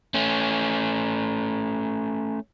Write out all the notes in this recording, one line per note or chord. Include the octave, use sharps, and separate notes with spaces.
A3 C#4